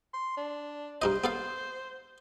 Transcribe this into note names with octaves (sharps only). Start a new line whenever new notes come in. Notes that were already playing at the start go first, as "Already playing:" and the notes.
C6
D4
G2 D#4 C5 D#5
B3 A4 F5